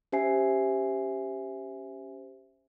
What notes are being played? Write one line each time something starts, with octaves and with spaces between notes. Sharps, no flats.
C#4 G4 C5 E5 G#5 C7